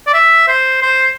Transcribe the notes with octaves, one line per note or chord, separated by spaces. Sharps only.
D5
E5
C5
C5